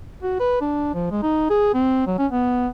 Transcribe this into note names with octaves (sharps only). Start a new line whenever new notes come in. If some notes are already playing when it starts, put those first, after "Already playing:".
F#4
B4
D4
F3
G#3
D#4
G#4
C4
F#3
C#4
B3